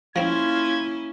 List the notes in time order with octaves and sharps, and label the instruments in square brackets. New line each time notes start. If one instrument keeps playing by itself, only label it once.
[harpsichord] F3 C4 [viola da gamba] A#3 C#4 E4 [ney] F4 [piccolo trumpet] G#6